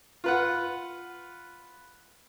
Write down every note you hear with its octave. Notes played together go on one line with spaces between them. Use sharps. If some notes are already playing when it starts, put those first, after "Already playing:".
F4 B4 F#5